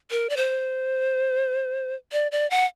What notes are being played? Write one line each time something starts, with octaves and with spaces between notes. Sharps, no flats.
A#4
D5
C5
D5
D5
F#5